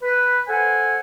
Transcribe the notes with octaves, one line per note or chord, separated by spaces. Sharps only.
B4
A4 C5 F#5 G#5